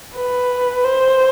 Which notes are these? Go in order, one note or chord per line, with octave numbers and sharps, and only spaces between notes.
B4
C5